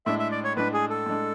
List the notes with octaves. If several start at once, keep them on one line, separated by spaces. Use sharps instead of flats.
A2 G#3 D4 E5
E5
D5
C#5
A2 G#3 D4 B4
G#4
A4
A2 G#3 D4